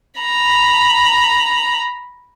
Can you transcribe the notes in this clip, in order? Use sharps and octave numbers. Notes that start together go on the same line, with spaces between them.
A#5 B5